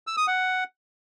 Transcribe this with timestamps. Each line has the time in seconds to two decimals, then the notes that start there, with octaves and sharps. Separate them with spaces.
0.07 E6
0.17 D#6
0.27 F#5